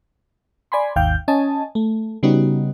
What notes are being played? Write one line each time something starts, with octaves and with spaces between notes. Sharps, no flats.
D5 G#5 B5 C6
G#1 D#2 F5 G5 G6
C#4 D#5 G#5 A5
A3
C#3 G3 B3 D#4 F#4